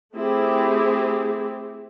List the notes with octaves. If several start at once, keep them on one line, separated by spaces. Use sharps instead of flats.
A3 C4 E4 G4 G#4